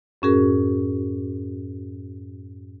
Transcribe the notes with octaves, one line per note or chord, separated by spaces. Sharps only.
F#2 A2 C#4 F#4 G#4 A#4